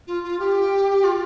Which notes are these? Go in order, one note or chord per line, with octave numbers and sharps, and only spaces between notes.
F4
F4
G4
F4